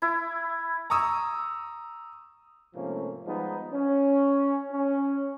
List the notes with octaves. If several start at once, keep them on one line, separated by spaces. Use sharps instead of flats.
E4
A#5 C#6 D#6 E6
G#2 C3 F3 A3 A#3 C#4
F3 G3 G#3 B3 D#4
C#4
C#4